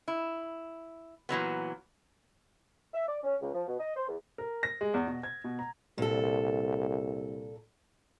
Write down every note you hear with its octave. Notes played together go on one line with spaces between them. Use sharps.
E4
A#2 E3 F#3 B3
E5
D5
C#4
C#2
F3
B2
D#5
C5
E2
A#4
A#6
G#3
E2
B2
G#6
B2
A#5
C2 A#2 A4